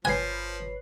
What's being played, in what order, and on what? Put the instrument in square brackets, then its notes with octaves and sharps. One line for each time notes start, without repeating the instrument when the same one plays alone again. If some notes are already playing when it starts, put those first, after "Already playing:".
[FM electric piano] G1 B4 C#5 [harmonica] F3 [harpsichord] G#5 [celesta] F#6 C7